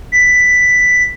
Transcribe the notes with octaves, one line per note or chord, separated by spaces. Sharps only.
B6